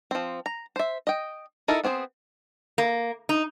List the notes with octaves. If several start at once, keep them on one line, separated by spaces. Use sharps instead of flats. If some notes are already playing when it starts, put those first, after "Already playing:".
F3 C4
A#5
C5 E5
D#5 G5
D#4 E4 A4 A#4
B3 C4 G#4 C5
A#3
D#4